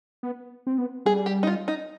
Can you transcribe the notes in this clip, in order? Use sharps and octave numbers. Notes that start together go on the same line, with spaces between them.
B3
C4
B3
G3 G#4
G4
D#4
F4
D#4